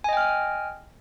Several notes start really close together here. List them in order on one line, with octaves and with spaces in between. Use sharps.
G#5 D#5 G5 F6